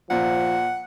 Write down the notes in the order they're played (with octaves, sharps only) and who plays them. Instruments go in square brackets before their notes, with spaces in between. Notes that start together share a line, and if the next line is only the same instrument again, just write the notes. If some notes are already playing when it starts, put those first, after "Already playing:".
[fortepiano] A#2 [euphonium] F3 [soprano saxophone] F#5